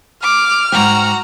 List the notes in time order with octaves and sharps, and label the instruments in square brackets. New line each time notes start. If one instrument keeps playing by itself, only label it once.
[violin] D6 [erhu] F6
[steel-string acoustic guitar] G#2 D#3 G5 [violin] F#4 A#5